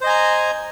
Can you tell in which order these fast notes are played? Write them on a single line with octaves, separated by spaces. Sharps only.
C5 D#5 G#5 A#5